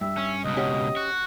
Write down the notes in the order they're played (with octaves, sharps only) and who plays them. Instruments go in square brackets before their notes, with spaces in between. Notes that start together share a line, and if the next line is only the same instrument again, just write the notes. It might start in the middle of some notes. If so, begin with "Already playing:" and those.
[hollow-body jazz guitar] G2 [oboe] E5
[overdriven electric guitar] C#4
[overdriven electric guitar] C#2 B2 [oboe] D#5
[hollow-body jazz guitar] C#4 G4 F#5
[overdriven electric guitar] F#4